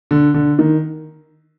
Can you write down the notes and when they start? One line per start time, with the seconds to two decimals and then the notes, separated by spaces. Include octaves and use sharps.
0.11 D3
0.34 D3
0.59 D#3